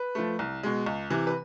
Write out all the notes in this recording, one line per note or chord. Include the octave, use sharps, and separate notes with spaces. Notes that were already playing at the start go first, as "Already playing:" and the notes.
Already playing: B4
F3 A3
C2
B2 G#3
C#2
C3 E3
B4